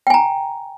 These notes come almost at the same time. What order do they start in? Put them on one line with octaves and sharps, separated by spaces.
G5 G#5 A#5